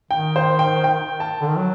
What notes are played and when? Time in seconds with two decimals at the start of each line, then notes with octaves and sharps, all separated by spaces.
0.11 D#3 G5
0.36 C5
0.59 G5
0.84 G5
1.20 A5
1.41 D3
1.49 D#3
1.57 F#3